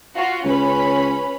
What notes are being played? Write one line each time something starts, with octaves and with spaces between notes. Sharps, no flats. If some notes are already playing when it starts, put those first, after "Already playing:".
F4 F#4
C#2 C#4 B4 B5